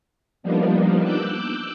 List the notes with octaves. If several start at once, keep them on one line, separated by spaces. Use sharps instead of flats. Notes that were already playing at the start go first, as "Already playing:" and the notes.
F3 G3 A#3 B3 D4 D#4
D6 E6 F#6 G6